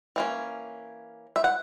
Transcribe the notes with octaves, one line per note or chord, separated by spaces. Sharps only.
E3 A#3 C#4
E5
F#5